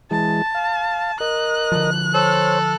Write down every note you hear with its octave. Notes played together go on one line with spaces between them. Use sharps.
E3 G#3 A5
F5
A#4 D#5 F#6
D3 F3
A4 C5 C#5